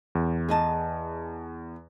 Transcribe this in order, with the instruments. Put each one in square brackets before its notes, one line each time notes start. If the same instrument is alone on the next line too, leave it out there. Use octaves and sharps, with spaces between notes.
[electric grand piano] E2
[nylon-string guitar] G#4 D#5 A5